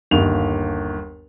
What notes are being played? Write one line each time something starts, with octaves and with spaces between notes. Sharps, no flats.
G1 D#2 F7